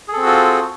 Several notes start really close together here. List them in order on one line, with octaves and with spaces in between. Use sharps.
G#4 A4 C4 F#4 F4